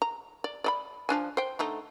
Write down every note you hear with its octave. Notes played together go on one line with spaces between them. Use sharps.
A#5
D5
D5 D#5 B5
F3 D4 G#5
C5 G5
D3 A3 D#4